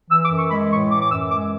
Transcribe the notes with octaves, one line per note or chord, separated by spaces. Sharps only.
E3 E6
D6
F#2
C#6
G#3 B5
A2 C#6
E3 D6
D6
F#2 E6
G#3 D6